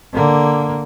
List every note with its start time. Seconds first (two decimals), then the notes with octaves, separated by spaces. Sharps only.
0.13 D3 A#3